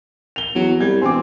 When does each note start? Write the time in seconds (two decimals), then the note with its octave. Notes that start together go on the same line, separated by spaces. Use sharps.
0.36 F7 G7
0.55 E2 F#3
0.81 C2 G3 G#6
1.01 E1 C4 G#5 D6